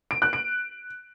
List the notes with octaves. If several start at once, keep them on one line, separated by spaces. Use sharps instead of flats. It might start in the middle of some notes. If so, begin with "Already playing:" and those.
D7
F#6
D7